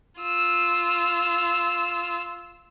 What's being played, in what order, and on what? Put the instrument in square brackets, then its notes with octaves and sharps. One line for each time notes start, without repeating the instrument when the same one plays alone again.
[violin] F4 E6